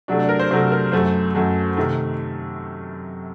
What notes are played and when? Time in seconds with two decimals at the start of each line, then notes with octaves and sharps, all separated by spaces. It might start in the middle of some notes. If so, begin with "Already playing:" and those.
0.08 C3 F#3 A3 D4
0.19 D4
0.29 A#4
0.39 C5
0.50 C3 F#3 A3 C5
0.72 A#4
0.92 F#2 F#3 A3 C5
1.35 F#2 F#3 A3
1.77 C3 D#3 A3